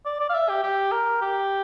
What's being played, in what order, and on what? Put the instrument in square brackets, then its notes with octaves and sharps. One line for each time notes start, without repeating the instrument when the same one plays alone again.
[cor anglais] D5
D5
F5
E5
G4
G4
A#4
G4